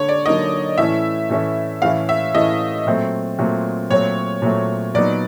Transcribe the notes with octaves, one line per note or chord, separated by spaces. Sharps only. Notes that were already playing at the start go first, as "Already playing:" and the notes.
Already playing: D3 C#5
D5
D3 F#3 A#3 D#4 D#5
A2 E3 A3 C#4 E4 E5
A2 E3 A3 C#4 E4
A2 E3 A3 C#4 E4 F5
E5
A2 E3 A3 C#4 E4 D#5
A#2 F#3 A3 C4
A#2 F#3 A3 C4
A#2 F#3 A3 C4 C#5
A#2 F#3 A3 C4
A#2 F#3 B3 D#4 D5